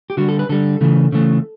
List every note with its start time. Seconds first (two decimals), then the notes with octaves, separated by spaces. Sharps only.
0.10 G4
0.17 D3 G3 F#4
0.28 A4
0.39 B4
0.49 D3 G3 A4
0.81 C#3 E3 A3
1.12 C#3 E3 A3